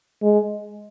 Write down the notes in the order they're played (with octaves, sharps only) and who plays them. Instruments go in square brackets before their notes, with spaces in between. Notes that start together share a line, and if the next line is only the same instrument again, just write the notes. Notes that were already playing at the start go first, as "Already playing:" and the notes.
[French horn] G#3